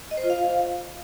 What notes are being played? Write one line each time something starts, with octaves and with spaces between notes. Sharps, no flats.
D#5
C5
F4
F5